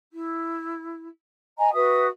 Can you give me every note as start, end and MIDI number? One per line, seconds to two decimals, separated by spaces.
0.12 1.07 64
1.58 1.71 75
1.58 1.71 80
1.58 1.71 82
1.73 2.05 66
1.73 2.05 71
1.73 2.05 76
1.73 2.05 87